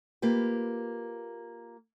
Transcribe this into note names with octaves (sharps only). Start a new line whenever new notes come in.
A#3 F4 G4 B4